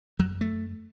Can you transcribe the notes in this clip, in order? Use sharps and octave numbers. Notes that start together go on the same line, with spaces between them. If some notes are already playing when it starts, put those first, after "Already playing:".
F#2 F#3
A3